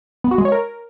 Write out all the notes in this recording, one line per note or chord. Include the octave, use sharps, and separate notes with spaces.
B3
F#4
G#3
C#5
A#4